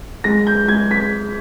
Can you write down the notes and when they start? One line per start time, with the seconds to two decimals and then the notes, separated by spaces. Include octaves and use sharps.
0.24 G#3 A#6
0.47 G6
0.68 G#3 G#6
0.91 B6